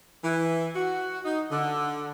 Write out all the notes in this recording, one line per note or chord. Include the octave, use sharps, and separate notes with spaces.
E3
F#4
D#4
D3